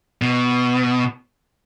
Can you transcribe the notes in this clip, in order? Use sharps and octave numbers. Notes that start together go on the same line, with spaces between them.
B2